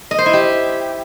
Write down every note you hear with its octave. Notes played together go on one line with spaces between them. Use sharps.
D#5
C5
E4
G4